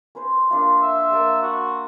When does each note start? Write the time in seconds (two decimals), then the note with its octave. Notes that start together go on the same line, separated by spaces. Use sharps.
0.15 C#4 B4 C5
0.51 A#3 D4 F4
0.82 E5
1.10 A#3 D5 G5
1.42 F#4